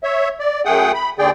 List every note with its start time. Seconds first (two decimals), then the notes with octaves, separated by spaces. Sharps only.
0.03 C#5 E5
0.40 D5
0.65 F#2 A3 G#4 F#5 G5 D#6
0.94 B5
1.19 D#2 D3 G#4 D5 G5